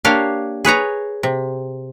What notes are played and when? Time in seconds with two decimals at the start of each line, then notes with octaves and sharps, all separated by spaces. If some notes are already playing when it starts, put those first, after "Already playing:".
0.05 A#3 D4 G4 C#5 F5
0.65 G#4 B4 C#5 A#5
1.23 C3